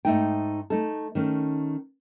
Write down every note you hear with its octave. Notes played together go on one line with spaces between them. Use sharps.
G#2 A3 D#4 G5
A3 D#4 A4
D#3 A3 C#4